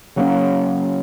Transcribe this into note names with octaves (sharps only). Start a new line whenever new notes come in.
C#3 F#3 A#3 C#4